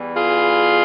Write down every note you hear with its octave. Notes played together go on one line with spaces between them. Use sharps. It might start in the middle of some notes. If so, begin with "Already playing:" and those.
Already playing: E2 E3 G3
F4 G#4